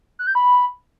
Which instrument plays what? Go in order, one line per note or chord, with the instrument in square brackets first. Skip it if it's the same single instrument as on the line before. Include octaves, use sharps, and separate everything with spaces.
[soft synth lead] F#6
G6
B5